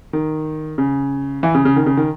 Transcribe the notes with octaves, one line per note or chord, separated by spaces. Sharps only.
D#3
C#3
E3
C#3
C#3
D#3
C#3
D#3